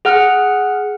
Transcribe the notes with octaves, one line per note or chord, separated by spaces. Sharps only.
G#4 F#5 F6